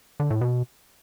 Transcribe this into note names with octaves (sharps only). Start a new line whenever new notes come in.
D3
A2
B2